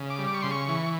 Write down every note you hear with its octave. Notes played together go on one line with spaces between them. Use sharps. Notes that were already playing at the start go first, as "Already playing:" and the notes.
Already playing: C#3
D6
G3
D6
C#6
C#3 C6
C#6
E3